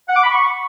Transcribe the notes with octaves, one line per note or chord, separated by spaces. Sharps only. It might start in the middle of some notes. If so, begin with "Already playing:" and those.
F#5
D6
B5
C#6